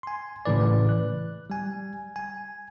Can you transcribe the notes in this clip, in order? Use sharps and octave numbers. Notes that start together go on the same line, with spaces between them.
G#5 C6
A2 C#3 E3 B4 D5
F#6
G3 G#5
G#5